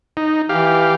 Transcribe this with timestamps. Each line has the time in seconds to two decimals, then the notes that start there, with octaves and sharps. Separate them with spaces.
0.17 D#4
0.49 E3 G4 F5